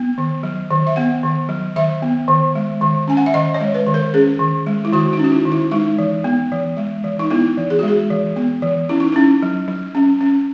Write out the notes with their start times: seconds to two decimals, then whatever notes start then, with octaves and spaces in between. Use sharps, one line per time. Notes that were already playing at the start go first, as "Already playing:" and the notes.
Already playing: B3
0.18 D#3
0.43 F#3
0.71 D#3
0.87 E5
0.96 B3 F#5
1.23 D#3
1.49 F#3
1.76 D#3 E5
2.02 B3
2.28 D#3
2.55 G#3
2.81 D#3
3.08 C#4 G#5
3.17 F#5
3.26 E5
3.34 D#3 D#5
3.54 C#5
3.61 G#3
3.74 B4
3.87 D#3
3.94 A#4
4.14 C#4 G#4
4.39 D#3
4.67 G#3
4.85 E4
4.93 D#3 F#4
5.13 D#4
5.19 C#4 F#4
5.32 E4
5.45 D#3
5.52 E4
5.71 G#3 D#4
5.98 E3
6.24 B3
6.52 E3
6.77 G#3
7.04 E3
7.19 D#4
7.30 B3 E4
7.58 E3
7.70 G#4
7.79 G#3 F#4
7.88 G#4
8.10 E3
8.36 B3
8.62 E3
8.89 C#4 E4
9.00 D#4
9.12 C#4 E4
9.42 F#3
9.68 F#3
9.95 C#4
10.21 C#4